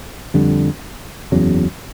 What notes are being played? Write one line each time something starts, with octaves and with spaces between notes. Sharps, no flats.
F2 D3 G3
F#1 E2 C#3 F#3